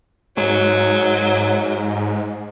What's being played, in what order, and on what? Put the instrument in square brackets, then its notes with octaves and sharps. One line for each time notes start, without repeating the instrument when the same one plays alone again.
[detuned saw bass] G#2 [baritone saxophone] F#3